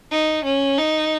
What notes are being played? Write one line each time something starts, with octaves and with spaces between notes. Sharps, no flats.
D#4
C#4
D#4